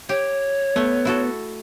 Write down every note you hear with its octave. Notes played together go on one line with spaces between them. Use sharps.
G4 C#5
A3 B3
E4 F#4 A4